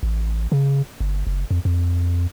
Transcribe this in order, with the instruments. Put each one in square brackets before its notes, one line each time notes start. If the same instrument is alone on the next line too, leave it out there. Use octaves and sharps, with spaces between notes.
[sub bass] A1
C#3
G1
F#1
F2
F2